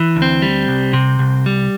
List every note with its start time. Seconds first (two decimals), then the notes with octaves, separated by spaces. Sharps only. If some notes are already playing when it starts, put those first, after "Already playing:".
Already playing: E3
0.16 D2
0.22 C4
0.42 G3
0.68 C2
0.93 C3
1.19 C2
1.46 G3